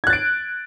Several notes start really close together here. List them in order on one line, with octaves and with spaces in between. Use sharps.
G#6 F#6 A6 D7